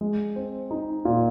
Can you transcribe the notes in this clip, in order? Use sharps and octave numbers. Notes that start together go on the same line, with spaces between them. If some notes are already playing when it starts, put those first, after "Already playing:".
G#3
C4
D#4
A#2